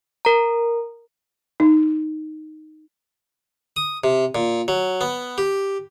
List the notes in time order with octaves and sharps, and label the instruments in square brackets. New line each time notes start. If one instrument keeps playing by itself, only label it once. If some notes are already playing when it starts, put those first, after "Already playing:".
[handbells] A#4 A#5
[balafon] D#4
[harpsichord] D#6
C3
A#2
F#3
B3
G4